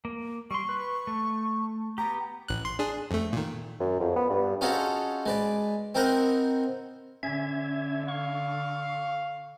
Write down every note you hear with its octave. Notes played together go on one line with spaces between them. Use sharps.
A#3
G3 C6 C#6
B4
A3
B3 G4 A#5
A1 F#6
C6
D4 G#4
F2 A3
A#2 D#3
F#2
F2
B3
G2
C#4 D#4 F4 F#4 G#4 A4
G#3 B4 D5
C4 D#4 E4 A#4 D#5 F#5
D3 C#4 E5 G#6
F5 C#6